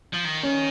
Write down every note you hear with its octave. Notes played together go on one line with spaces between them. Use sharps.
F3
D#3
C#4